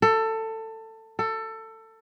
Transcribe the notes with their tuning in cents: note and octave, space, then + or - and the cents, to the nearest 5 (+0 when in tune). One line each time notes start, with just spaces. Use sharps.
A4 +20
A4 +20